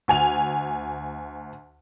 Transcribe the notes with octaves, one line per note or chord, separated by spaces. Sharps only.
D2 G#5 F7